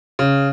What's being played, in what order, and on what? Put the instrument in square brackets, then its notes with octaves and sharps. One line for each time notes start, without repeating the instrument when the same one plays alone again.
[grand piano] C#3